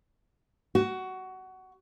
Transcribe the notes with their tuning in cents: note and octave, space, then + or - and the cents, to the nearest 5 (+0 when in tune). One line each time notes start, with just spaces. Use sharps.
F#4 +15